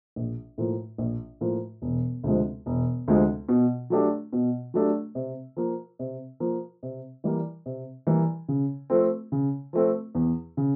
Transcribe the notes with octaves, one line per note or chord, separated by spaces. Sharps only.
A#1
A2 F3 A#3
A#1
A2 F3 A#3
E1
D2 C3 F3 G#3
E1
D2 C3 F3 G#3
B2
F#3 A3 D4 G4
B2
F#3 A3 D4 G4
C3
F3 A#3
C3
F3 A#3
C3
E3 G3 A#3
C3
E3 G3 A#3
C#3
F3 A3 C4
C#3
F3 A3 C4
E2
C#3